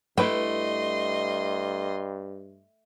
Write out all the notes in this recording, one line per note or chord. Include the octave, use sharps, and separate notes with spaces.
G2 A3 E4 B4 D#5 G5 C6